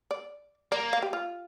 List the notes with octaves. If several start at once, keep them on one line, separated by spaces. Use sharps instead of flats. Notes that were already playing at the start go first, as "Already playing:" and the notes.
D5
A#3 D5
F5
G4
F4